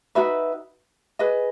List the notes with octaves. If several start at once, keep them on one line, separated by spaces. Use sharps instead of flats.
D#4 F#4 B4 E5
G#4 B4 D#5